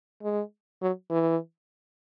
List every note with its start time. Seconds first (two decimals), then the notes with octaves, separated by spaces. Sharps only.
0.23 G#3
0.82 F#3
1.10 E3